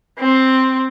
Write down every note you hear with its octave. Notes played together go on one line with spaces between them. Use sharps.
C4